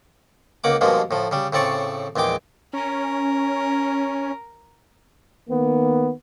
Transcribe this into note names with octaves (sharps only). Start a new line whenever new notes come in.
C#2 A#3 F#5 D6
G2 B2 F3 G#3 A#3
A2 F3
C#3 G3
A2 C#3 C4 D5 C#6
A#1 E2 G#3 G5 D6
C#4 A#4
D#3 A#3 B3